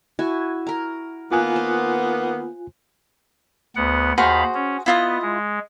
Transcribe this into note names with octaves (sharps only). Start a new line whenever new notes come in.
E4 F#4 G#5
A#4 A#5
D#3 A#3 B3 F4 G#5 F#6
C5
D2 B3 F#5
D#2 F#4 G#4 C5 F5 B5
C#4
B3 E4 F4 D#5
G#3